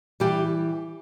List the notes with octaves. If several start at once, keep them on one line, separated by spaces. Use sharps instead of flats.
E3 G3 G4